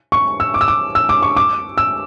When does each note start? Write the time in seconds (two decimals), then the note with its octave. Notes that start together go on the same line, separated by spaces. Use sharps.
0.12 C#6
0.40 E6
0.54 D6
0.61 E6
0.68 D6
0.95 E6
1.09 D6
1.22 C#6
1.37 D6
1.78 E6